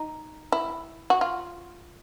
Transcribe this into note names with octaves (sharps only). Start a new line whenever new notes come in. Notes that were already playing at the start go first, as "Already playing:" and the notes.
Already playing: D#4
E4
F#4
F4